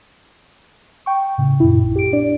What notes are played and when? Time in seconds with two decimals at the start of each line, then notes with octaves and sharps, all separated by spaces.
1.06 G5 C#6
1.38 A2 C#3
1.60 F#2 A#2 E4
1.83 A#1
1.96 G4 D7
2.13 D4 D5